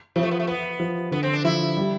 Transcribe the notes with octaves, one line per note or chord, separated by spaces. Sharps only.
C3 F3
A3
B3
A3
B3
F3
D3 B3
C4
D4
F3 E4
G3